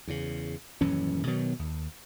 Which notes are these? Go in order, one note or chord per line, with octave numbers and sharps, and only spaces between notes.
E2 C#3
D#1 F#2 E3 C#4
B2 D#3 F#3
D#2